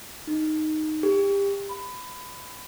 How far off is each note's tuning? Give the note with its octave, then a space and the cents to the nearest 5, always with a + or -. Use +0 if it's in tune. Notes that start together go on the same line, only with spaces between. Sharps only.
D#4 -5
G4 +25
B5 +20